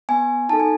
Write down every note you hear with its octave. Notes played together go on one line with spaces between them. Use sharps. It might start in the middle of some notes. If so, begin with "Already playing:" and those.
B3 G#5
D#4 F#4 A4 A5
G#5